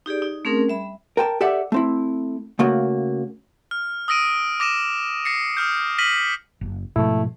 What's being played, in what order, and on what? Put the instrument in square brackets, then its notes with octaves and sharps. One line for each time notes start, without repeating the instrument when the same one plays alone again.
[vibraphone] D#4 G4 G#4 D5
D#4
A3 C4 C#4 G#4 A#4
G3 E5 B5
[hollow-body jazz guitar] A#4 G5 A5
G4 A4 D5 E5 F#5
A3 C4 E4
C#3 A3 A#3 F#4
[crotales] F6
D#6 E6 A#6 D7 D#7
D6 A#6 D#7 E7
A#6 C7 C#7
D#6 F6 G6
F6 A#6 B6 D#7 F#7
[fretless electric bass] F#1
[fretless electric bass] G#2 B2 F3 [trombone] A3 [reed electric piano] E4